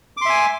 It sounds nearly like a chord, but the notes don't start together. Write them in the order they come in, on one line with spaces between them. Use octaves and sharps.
D6 C6 E5 G#5